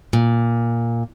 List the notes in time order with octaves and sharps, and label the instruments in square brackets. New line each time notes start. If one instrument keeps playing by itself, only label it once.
[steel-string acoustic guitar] A#2